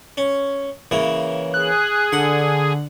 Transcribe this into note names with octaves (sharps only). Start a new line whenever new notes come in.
C#4
C#3 E3 A#3
G#4 F#6
D3 F#5